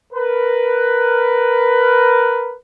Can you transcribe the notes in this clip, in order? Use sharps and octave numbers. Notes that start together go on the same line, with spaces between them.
A#4 B4